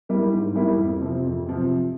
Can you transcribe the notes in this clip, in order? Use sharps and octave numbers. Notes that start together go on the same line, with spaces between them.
G3 A#3 E4
G#2
G3 A#3 E4
F2
C3 F3 C4
F2
C3 F3 C4